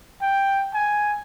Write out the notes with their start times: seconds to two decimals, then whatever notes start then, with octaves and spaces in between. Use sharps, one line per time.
0.22 G5
0.74 G#5